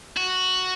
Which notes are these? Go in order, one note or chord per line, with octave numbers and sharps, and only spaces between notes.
F#4